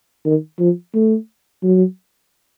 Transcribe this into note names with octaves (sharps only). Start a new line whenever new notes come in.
D#3
F3
A3
F#3